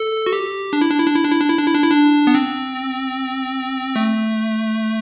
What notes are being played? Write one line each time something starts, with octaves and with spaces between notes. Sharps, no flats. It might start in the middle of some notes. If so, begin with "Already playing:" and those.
Already playing: A4
F#4
G4
D4
E4
D4
E4
D4
E4
D4
E4
D4
E4
D4
E4
D4
E4
D4
B3
C4
A3